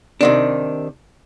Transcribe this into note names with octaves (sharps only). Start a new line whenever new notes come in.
C3 D#3 D4